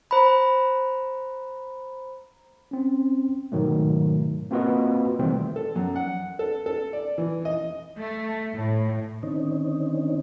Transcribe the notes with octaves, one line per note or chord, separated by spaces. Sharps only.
C5 A#5 B5
C4 C#4
G#2 B2 D#3 F#3 A3
A#3 C4 F4 F#4 B4 D#5
B2 D#3 E3 G3 A3 C4
A4
F#2
F#5
A4
A4
D5
E3
D#5
A3
A2
D3 D#3 C4 C#4 D#4